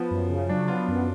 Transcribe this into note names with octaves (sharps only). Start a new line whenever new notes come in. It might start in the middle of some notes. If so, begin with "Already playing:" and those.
Already playing: F3 B3
F#2
C#3
F#3 D4
B3 F4
F#2